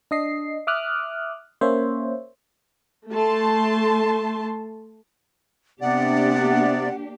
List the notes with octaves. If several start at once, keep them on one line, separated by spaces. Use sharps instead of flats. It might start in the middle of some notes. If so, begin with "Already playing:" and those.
D4 D#5 C7
E5 D6 D#6 F6 F#6
A#3 C#4 C5 C#5 E5
A3 A5 C6
C3 A#3 B3 D4 G4 D5 F#5